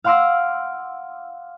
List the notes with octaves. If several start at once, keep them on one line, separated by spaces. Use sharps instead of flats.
F5 F#5 C6 D6 E6 A#6